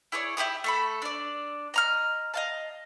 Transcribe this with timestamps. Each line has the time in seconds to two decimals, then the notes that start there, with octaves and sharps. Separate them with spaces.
0.12 E4 G#4 C#5 D5
0.37 E4 G4 G#4 D#6
0.64 A3 A4 B5
1.02 D4 D5
1.74 D#5 A#5 F6
2.34 D#5 F5 A5